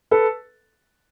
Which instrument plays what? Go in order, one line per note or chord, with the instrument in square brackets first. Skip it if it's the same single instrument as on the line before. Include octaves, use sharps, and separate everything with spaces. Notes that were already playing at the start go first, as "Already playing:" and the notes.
[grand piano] A4 B4